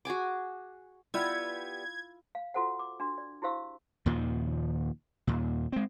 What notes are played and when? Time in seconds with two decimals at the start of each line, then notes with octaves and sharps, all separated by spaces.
0.05 F#4 G#4 G#5 D6
1.14 G3 B3 E4 F4 G#6
2.35 F5
2.54 F4 F#4 A4 C5 F#5
2.79 D6
3.00 D4 F#4
3.18 D5
3.42 E4 F#4 G4 C5 F5 E6
4.06 D#2 A#2 D#3 F3
5.27 D#2 A#2
5.72 G#3 C4